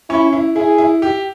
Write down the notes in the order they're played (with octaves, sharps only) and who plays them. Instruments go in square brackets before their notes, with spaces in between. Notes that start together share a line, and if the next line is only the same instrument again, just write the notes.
[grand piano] C#4 [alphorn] E4
[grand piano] E4
[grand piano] E4 [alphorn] G#4
[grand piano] E4
G4